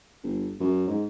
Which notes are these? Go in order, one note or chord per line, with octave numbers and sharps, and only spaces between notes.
G1
F#2
G#2